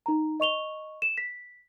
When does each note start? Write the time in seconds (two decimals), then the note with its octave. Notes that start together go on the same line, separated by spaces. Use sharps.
0.06 D#4 A#5
0.40 D#5 C#6 F7 G7
1.02 E7
1.18 B6